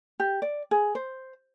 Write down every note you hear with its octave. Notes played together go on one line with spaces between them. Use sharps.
G4
D5
G#4
C5